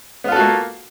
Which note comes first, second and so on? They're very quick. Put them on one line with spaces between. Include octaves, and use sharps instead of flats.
B3 F4 A4 F#4 A#3